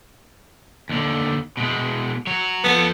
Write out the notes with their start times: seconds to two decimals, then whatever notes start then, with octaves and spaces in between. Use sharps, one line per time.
0.89 D#2 D3
1.57 B2 G#3
2.27 F#3 C#5
2.64 F3 B3 A4